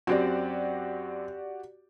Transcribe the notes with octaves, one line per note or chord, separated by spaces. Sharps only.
F#2 C4 F#4 G4 D5